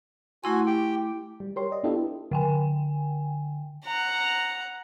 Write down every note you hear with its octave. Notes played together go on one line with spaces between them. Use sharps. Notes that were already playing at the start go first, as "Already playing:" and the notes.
A3 E4 F#4 G#5 C6
G4 G5
G3
G4 A#4 C#5 C6
D5 D#5
B3 D4 E4 F4 G4 A4
D3 G5 G#5
F#5 A#5